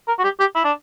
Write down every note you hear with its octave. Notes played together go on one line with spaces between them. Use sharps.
A#4
F#4
G4
G4
E4
D4